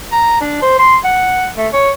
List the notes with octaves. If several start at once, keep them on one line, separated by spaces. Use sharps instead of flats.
A#5
D4
C5
C6
F#5
A3
C#5